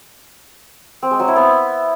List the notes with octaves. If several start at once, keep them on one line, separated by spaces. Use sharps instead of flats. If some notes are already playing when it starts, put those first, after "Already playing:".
C4
G#3
F#3
E4
B3